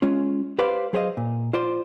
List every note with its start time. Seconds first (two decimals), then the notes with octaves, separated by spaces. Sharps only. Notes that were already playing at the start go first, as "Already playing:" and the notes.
0.02 G#3 C#4 F4
0.59 G4 B4 C5 D5 F5
0.93 F#3 G#4 C5 C#5 D#5 F5
1.17 A#2
1.53 F4 C5 D5 C6